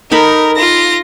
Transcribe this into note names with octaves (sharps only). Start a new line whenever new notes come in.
D#4 A4 A#4 B5
F4 A#6